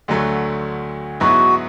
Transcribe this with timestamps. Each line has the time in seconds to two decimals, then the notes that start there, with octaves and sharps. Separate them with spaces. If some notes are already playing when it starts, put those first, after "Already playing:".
0.08 D2 D3 F#3 A3
1.20 G#2 F#3 B3 E4 F#4